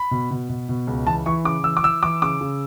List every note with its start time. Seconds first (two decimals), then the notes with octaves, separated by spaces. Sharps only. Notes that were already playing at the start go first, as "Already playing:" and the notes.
Already playing: B5
0.11 B2
0.31 B2
0.49 B2
0.69 B2
0.87 C#2
1.07 E3 A5
1.26 E3 C#6
1.45 C#3 D6
1.64 E3 E6
1.77 D6
1.83 E3 E6
2.03 E3 D6
2.22 C#3 D6
2.41 C#3